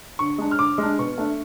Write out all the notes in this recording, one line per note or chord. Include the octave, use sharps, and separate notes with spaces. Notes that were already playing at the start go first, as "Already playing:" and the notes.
D3 C#6
G#3 D4
F6
D3 D6
G#3
D4
B2 C#6
A3 D4